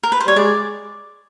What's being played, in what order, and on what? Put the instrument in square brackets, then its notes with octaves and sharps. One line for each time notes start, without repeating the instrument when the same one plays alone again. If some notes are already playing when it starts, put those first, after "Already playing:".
[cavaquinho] A#4
B4
C5
[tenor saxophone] G3 [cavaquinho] C#5
[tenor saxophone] G#3 [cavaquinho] D5